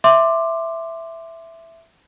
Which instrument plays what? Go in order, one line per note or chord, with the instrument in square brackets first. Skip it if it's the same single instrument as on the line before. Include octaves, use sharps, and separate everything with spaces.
[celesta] E5 C6 D6